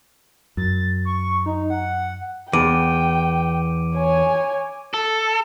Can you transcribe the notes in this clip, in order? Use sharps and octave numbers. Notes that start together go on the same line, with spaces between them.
F#2 A6
C#6
D#4
F#5
E2 G5 D6 D7 D#7
C#5 G#5
A4